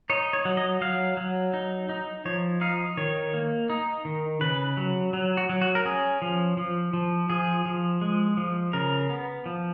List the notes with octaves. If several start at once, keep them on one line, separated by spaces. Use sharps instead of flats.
D#4 C#5
C#5
F#3
D#5
F#3 F5
F#3
D#4
D#4
F3 C#5
D#4 F5
D#3 C#5
A#3
D#4
D#3
C#3 B4
F#3
F#3
F#4
F#3
F#4
A#4
C#4 G#4
F3
F3
F3
F3 G#4
F3
G#3
F3
C#3 A#4
B3
F3